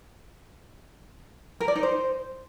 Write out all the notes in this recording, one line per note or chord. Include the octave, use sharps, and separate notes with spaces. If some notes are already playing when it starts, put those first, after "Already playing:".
A#4
D5
D#4
C5